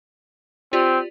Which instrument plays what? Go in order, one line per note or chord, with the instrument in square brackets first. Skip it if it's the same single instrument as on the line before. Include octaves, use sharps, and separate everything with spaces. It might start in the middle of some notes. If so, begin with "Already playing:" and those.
[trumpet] C4 [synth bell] F4 G4 D5